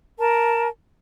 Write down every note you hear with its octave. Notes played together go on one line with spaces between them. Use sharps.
A#4 A5